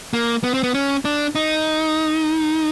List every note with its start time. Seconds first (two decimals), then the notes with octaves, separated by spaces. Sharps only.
0.13 A#3
0.43 B3
0.54 C4
0.63 B3
0.74 C#4
1.05 D4
1.35 D#4